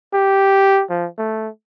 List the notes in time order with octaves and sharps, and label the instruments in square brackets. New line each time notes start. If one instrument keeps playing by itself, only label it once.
[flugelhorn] G4
F3
A3